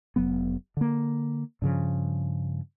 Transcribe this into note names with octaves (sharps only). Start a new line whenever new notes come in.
F1 F#3 B3
D3 A#3
G2 C#3 F3